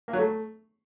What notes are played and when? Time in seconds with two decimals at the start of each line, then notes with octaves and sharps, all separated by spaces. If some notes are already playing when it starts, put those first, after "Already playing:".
0.08 A#3
0.13 F#3
0.19 A3